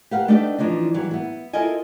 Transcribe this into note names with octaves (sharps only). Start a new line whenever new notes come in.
G4 A#4 B4 F5 F#5
A3 D4 D#4 G4 B4 D5
E3 F3 D4 D#4
E3 F#3 G3
B3 E4
E4 F4 A4 A#4 D#5 G#5